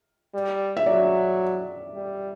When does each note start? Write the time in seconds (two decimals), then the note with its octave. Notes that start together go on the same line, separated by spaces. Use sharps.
0.34 G3
0.77 E5
0.86 F#3 D5
1.94 G3